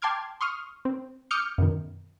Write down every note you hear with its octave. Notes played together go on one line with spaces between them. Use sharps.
G5 A5 C6 D6 F6 G#6
C6 C#6 D#6 F6
C4
D6 D#6 F6 G6 C#7
F#2 B2 D#3